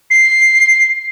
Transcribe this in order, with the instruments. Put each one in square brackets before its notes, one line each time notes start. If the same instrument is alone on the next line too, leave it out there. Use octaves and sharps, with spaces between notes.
[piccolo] C7